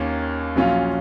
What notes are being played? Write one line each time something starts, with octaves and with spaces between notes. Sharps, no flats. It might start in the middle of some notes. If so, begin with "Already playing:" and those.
Already playing: D#2 D#3 A#3 C#4
A#1 A#2 F#3 C#4 F4